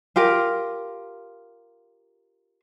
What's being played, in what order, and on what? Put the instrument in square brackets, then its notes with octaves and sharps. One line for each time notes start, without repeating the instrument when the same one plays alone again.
[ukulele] F4 G4 A#4